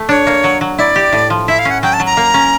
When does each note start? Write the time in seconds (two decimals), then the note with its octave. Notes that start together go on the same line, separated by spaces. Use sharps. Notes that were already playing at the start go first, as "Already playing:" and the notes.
Already playing: A3
0.09 D4 C#5
0.27 A#3
0.44 F#3
0.61 F#3
0.78 E4 D5
0.96 G4
1.13 A2
1.30 F3
1.48 E4 E5
1.59 F5
1.65 C#4
1.71 F#5
1.83 F#3 G5
1.93 A5
2.00 F#3
2.06 A#5
2.17 A#3
2.34 C#4